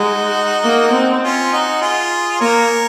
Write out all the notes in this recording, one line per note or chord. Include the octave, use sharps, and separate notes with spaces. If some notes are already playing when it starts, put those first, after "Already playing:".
Already playing: G#3 D#4 F#4
A#3
C4
C#4 F4
D#4 F#4
F4 G#4
A#3 A#4 C#5